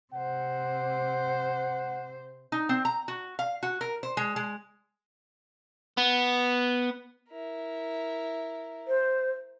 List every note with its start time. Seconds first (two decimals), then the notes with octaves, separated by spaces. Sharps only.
0.14 C3 C5 F#5
2.52 D#4
2.69 C4
2.85 A#5
3.08 F#4
3.39 F5
3.63 F#4
3.81 A#4
4.03 C5
4.17 G#3
4.36 G#3
5.97 B3
7.30 E4 A#4
8.87 C5